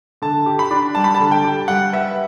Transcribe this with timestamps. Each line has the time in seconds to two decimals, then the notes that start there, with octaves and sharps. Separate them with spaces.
0.22 D3 A5
0.46 G4
0.59 B5
0.71 D4
0.95 G3 A5
1.04 B5
1.14 A5
1.20 D3
1.31 G5
1.44 G4
1.68 G3 F#5
1.93 B4 E5